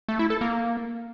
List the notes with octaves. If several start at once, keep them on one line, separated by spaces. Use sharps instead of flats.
A3
E4
A4
A#3